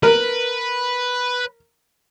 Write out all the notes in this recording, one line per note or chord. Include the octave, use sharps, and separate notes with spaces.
A#4 B4